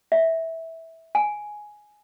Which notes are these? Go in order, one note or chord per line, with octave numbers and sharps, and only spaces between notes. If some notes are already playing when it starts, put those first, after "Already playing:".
E5
G#5